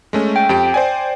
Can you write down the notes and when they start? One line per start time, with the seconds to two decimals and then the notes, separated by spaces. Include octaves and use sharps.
0.13 G#3 A3 C#4
0.36 G5
0.49 F2 G4 D7
0.74 C5 D5 G#5